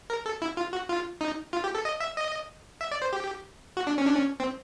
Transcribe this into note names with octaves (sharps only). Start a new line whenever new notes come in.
A#4
A4
E4
F4
F#4
F4
D#4
F4
G4
A4
D#5
E5
D#5
E5
D5
C5
G4
F#4
D4
C#4
D4
C#4
C4